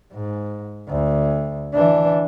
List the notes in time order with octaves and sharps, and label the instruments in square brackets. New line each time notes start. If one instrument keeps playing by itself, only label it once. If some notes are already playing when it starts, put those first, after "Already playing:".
[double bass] G#2
D2
E3 D4